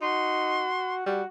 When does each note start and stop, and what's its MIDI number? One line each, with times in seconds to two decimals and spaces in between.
0.02 0.68 63
0.02 1.01 66
0.02 0.94 84
1.06 1.22 55
1.06 1.26 66